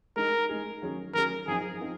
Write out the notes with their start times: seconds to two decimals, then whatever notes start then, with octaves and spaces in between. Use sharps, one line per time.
0.16 G#3 D#4 G#4 A#4
0.49 G#3 D#4 G#4
0.82 D#3 F#3 C#4 G#4
1.14 D#3 F#3 C#4 G#4 A#4
1.47 F#2 F3 C4 D#4 G#4
1.81 F3 C4 D#4